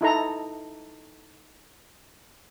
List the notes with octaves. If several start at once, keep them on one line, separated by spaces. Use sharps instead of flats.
D#4 E4 A4 A#5